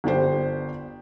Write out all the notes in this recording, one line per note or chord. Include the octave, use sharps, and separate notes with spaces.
G1 D4 G4 C5